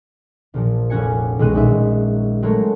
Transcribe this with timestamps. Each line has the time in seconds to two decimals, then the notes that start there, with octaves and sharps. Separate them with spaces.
0.54 A#1 A#2 F3
0.90 F1 G3 C#4 F#4 G#5 C#7
1.39 B1 D#3 G#3 D#4 F#6 D#7
1.53 A#1 D#4 E5
2.42 F#3 G#3 A3 G#4 A#4 C#5